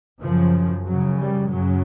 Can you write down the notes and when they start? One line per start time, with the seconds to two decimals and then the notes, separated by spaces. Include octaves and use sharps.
0.21 F#2 C#3 F3
0.85 F#2 C#3 F#3
1.18 G3
1.50 F#2 C#3 F#3